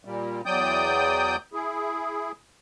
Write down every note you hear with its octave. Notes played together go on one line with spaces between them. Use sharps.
A#2 G3
E2 F#3 D5 G5 D#6 G6
E4 G#4